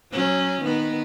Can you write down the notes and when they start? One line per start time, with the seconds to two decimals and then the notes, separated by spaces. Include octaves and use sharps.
0.12 F#3 C#4
0.62 D#3 B3